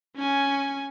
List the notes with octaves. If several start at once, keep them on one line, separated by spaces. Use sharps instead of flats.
C#4 G#5